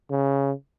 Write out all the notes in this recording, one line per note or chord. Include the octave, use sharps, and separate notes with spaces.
C#3